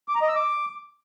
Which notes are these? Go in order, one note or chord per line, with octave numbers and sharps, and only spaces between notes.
D6
A#5
D#5
E6
D6